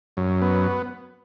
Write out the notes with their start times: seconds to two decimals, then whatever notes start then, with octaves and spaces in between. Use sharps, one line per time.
0.17 F#2
0.42 B3